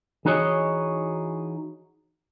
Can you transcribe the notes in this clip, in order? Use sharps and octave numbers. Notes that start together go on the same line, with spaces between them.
E3 D#4 F#4 G#4 C#5 D#5